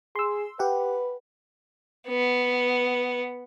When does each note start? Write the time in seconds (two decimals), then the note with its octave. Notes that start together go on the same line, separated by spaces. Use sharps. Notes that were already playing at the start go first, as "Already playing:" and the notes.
0.16 G#4 C6 E6
0.59 G4 B4 F#5
2.08 B3